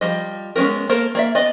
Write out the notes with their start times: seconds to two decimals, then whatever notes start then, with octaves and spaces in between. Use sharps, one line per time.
0.01 F3 G3 D#5
0.56 G#3 B3 C#4 F#4 A#4
0.89 A#3 A4 A#4 C5
1.15 A#3 D5 E5
1.35 B3 D5 D#5